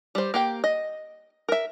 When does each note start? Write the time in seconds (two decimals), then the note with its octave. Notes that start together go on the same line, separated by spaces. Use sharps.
0.15 G3 C5
0.34 A#3 G4 G5
0.64 D#5
1.49 A#4 E5